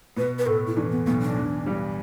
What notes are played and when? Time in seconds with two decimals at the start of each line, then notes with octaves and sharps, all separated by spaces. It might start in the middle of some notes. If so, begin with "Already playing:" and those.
0.16 B2 B3 B4
0.39 B4
0.46 A2 A3 A4
0.67 E4
0.76 E2 E3 D4
0.91 B3
1.06 B1 B2 B3
1.22 D4
1.36 E2 E3
1.66 G2 G3